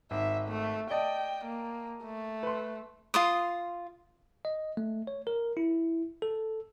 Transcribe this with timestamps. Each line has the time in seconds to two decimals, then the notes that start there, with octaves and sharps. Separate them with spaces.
0.11 G#1 E5
0.48 A3
0.90 D5 D#5 G5 A5
1.45 A#3
2.04 A3
2.43 B4 C6
3.14 F4 C6 D#6
4.45 D#5
4.77 A3
5.07 C#5
5.27 A#4
5.57 E4
6.22 A4